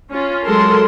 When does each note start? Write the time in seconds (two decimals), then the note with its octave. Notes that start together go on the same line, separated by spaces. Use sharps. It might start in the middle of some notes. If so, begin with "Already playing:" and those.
0.10 C#4 F4
0.46 F#3 G#3 A4 A#4 C6